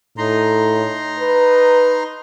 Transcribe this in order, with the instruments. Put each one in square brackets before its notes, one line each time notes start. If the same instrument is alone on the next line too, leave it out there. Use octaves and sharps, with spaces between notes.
[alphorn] A2 [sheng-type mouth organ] D#4 A#5 C6
[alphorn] B4